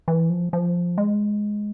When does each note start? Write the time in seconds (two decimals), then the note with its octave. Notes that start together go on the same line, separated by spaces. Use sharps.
0.08 E3
0.30 F3
0.53 F3
0.98 G#3